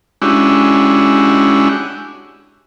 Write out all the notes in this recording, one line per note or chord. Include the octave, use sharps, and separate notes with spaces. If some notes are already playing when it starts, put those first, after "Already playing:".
G#3 C#4 D4 E4 F#4 G4